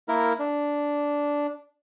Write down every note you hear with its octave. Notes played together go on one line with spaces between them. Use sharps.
A#3 E4 A#4
D4